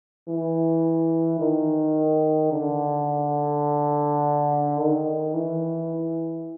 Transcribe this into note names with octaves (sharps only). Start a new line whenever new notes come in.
E3
D#3
D3
D#3
E3